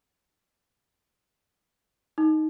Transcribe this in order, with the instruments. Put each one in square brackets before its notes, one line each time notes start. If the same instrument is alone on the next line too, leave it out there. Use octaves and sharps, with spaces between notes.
[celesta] D#4